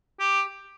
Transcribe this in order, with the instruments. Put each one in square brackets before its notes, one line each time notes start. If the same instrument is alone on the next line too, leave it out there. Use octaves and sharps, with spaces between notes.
[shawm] G4